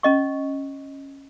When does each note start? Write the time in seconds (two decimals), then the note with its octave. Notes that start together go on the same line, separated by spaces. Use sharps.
0.03 C#4 D#5 C#6